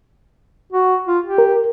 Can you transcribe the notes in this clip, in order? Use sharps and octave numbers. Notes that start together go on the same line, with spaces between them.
F#4
F4
G4
A#4